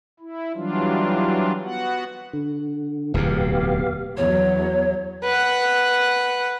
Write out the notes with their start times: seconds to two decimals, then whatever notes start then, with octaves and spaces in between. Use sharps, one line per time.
0.20 E4
0.55 E3 F#3 G3 D4 F4
1.64 B3 F#4 F#5
2.33 D3
3.14 D1 E2 B2 B3 G4 F5
4.17 E2 F#3 C#5
5.24 B4 F#5